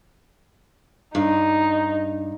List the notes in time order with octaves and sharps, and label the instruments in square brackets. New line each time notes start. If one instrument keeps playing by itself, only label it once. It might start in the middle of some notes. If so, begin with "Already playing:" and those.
[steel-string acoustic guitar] G2 [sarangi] D#4